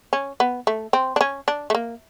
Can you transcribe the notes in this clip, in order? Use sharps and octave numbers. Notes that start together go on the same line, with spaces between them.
C#4
B3
A3
C4
D4
C#4
D4
A3
A#3